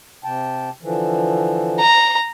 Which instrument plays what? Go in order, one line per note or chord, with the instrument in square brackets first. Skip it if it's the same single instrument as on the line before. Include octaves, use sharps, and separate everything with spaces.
[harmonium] C3 G5 A5
D3 E3 F3
[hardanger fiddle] A#5